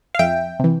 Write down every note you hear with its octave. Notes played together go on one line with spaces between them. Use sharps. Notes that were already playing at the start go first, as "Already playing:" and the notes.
F5
F2 E5 G5
C3 E3